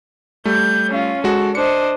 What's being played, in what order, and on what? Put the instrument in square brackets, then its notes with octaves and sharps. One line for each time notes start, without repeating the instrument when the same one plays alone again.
[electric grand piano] G3 A3 [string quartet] G6
[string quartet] C#4 F4
[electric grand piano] G#3 F#4 [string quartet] A4
[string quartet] D4 C5 D#5 [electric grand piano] C#7